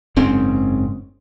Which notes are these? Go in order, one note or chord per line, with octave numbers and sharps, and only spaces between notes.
F#1 G#2 C4 C#4